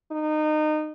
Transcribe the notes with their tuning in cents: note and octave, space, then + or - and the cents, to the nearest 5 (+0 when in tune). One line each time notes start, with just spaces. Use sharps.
D#4 -25